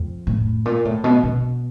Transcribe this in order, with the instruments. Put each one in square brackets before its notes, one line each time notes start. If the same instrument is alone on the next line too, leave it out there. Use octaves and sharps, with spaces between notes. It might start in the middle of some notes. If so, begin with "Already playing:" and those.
Already playing: [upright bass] F2
A2
A#2
A2
B2
B2